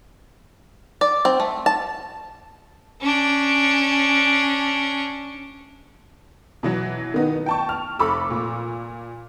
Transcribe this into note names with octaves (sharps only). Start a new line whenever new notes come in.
D5
C4
A3
A5
C#4 D4
B2 E3 F#3
D#3 B3 D#4
G5 A5 C#6
F6
F1 A4 B5 C#6 D6 E6
A#2